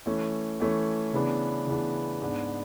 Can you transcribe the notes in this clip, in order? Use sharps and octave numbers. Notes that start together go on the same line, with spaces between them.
E3 A3 C#4
E3 A3 C#4
C#3 E3 B3 D4
C#3 E3 B3 D4
G#2 G#3 B3 D4